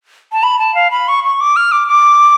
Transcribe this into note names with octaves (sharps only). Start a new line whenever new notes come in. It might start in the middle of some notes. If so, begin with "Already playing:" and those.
A5
B5
A5
F5
B5
C#6
C#6
D6
F6
D6
D6